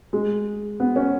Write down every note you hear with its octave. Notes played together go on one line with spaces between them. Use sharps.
G#3
B3
C#4